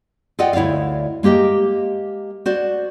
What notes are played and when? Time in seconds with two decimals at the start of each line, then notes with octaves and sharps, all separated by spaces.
0.39 F4 A4 D5 D#5 F#5 G5
0.53 D2 E4 C#5 D5 F5
1.23 G#3 A#3 G4 A#4 D#5
2.46 F#4 C5 D5